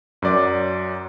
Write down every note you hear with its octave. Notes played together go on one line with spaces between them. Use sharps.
F#2 F#3 D5 D6